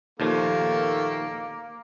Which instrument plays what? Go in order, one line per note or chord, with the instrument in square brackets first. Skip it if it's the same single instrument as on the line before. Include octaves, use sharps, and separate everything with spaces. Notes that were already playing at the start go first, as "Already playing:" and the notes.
[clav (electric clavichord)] D#2 A#2 F3 [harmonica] D#3 A3 A4 [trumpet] A#3